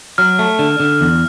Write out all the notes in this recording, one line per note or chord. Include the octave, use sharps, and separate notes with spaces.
F#3 F6
A3
D3
D3
E2